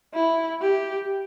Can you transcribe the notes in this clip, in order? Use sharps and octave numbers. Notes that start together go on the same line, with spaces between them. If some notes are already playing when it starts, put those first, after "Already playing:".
E4
G4